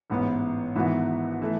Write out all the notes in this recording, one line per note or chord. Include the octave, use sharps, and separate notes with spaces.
A1 G#2 E3 B3
G#1 G#2 E3 B3 F#4
E3 A3